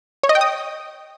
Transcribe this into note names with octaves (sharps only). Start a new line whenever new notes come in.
C#5
D#5
G5
D#6